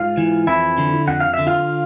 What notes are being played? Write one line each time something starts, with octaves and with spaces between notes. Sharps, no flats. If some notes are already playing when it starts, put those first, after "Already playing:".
Already playing: G#2 F4 F5
E3
F2 E4 E5
D3
F2 F#5
F5
D3 E5
F4 F5